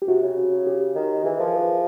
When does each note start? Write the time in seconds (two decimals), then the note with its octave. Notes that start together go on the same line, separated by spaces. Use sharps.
0.02 G4
0.08 C3 F#4
0.23 C#3
0.67 G4
0.95 D#3
1.24 E3 G#4
1.39 F3 A#4
1.54 B4